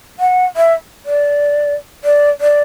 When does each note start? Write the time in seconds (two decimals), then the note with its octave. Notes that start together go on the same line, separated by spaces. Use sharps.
0.20 F#5
0.56 E5
1.06 D5
2.04 D5
2.41 D5